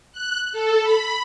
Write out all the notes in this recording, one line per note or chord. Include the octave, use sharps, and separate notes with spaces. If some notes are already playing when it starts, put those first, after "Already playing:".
F#6
A4
B5